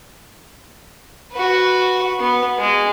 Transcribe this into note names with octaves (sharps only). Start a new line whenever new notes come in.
F#4 B4
B3
G#3